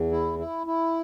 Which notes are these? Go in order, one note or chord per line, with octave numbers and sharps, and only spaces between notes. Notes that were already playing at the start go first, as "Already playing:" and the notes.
Already playing: E2
E4
E4
E4